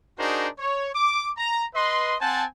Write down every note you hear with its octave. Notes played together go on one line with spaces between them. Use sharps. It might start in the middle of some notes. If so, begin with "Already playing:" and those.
D4 D#4 F#4 G#4 A#4 C5
C#5
D6
A#5
B4 D#5 C6
C4 C5 F#5 G#5 A5